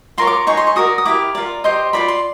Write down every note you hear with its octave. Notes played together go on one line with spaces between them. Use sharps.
F4 A#4 C#5 C6
D6
D#4 G#4 C#5 C#6
C6
C#6
F#4 A#4 D5 D#6
D#6
E4 G4 A#4 D6
F4 A#4 D5
G4 C5 D#5 C6
F4 A#4 D5 B5
C6